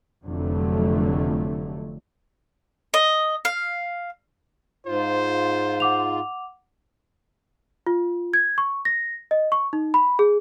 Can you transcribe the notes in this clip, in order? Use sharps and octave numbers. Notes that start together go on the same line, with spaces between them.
F1 F2 D3 F#3 A3
D#5
F5
G#2 F4 C5
F#5 D6 F7
F4
G#6
C#6
A#6
D#5
C#6
D#4
B5
G#4